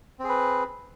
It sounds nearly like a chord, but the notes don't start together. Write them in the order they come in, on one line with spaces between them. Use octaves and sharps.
C4 G#4 B4